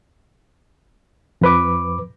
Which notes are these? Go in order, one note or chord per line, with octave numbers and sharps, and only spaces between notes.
F2 B4 D6